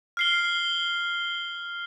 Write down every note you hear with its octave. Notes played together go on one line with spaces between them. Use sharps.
F6 C7 G7